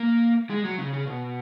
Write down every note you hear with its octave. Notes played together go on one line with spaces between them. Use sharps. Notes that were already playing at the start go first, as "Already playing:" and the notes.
Already playing: A#3
G#3
F#3
C#3
C#3
B2